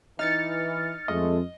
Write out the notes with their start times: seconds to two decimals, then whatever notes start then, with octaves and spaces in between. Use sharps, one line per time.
0.19 E3 D#4 F6 A6 C#7
1.08 F2 G#3 A3 D#5